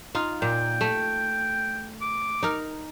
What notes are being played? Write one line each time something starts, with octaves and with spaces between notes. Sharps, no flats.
D#4 F4
A#2 G5
A3
D6
D#4 A#4